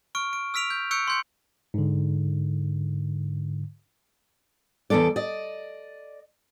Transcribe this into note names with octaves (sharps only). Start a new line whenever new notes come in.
C#6 F6 D7
D7
E6 F6 B6 D7 F7
G6
C#6 E6 F#6 G6 C#7 D7
C6 G6 C#7
G#2 D3
E2 B2 B3 A4 D5
D5 D#5